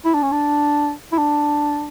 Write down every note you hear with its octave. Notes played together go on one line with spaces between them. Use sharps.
E4
D4
C#4
D4
E4
D4